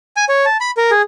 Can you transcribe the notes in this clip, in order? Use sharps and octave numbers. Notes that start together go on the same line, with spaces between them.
G#5
C#5
A5
B5
A#4
G#4